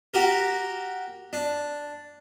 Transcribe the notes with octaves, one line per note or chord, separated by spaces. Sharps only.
F#4 G4 A#4
D4